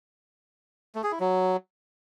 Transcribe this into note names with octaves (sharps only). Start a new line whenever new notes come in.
A3
G#4
E4
F#3